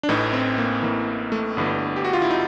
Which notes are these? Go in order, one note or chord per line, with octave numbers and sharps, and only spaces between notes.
D4
A1 A2 E3 D#4
C4
A#3
A1 A2 E3 A#3
A3
G1 G2 E3
G4
F#4
F4
E4
D#4